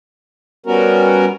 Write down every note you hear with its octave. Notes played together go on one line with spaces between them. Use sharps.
G3 B3 C#4 F#4 A#4